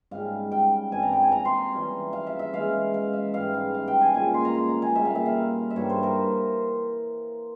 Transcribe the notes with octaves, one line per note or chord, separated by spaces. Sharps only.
G#2 G3 C#4 F5
G5
G2 G3 C4 G#5
A#5
G5
G#5
A#5
C6
E3 G3 C#4
F5
E5
E5
E3 G#3 C#4 F5
F5
E5
G#2 E3 G3 F5
F5
F5
G5
G#5
A#2 G#3 C#4 G#5
C6
A#5
C6
A#5
G#5
C#3 G3 A#3 E5
F5
E5
F5
E5
G2 E3 G3 A#3 C#5
C5
A#4